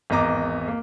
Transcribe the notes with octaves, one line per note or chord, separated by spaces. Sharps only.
G#1 E2 D#5 A#5 D6
A#3